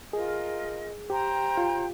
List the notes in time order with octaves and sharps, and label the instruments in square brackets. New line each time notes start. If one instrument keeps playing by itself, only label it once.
[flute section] F4 A#4 D#5 [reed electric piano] G#4
[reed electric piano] G4 [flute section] C5 G5 A#5
[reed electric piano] F4